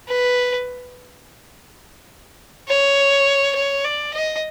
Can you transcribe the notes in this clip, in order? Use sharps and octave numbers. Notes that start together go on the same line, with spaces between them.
B4
C#5
C#5
D5
D#5